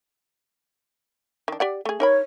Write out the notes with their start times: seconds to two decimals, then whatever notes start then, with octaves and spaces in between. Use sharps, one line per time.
1.48 D#3 D4
1.60 G4 D5 F#5
1.85 A3 G#4
2.00 D#4 A#4 C#5 B5